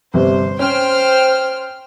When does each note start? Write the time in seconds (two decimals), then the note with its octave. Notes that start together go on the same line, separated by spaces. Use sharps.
0.14 G1 C3 C5
0.59 C#4 C5 G5 F6